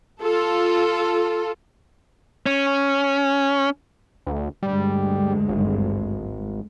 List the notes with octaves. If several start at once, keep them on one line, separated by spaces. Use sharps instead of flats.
F4 A4
C#4
D2
D2 G2 G3 G#3
G#1